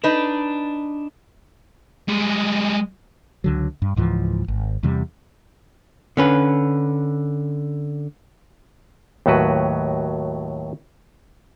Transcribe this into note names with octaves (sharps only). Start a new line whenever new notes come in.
D4 D#4 B4
G3 G#3
C#2 D3 F#3
G2
C#2 G#2 E3 F3
G#1
E2 C3 G3
D3 C#4 B4
D#2 A2 F#3 F#4 B4